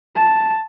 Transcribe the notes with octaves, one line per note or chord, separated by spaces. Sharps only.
A5